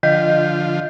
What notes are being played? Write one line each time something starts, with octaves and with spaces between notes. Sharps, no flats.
D3 F3 F4 D#5 G6